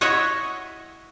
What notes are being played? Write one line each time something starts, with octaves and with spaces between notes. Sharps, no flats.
E4 F#4 C#5 D#5 F#5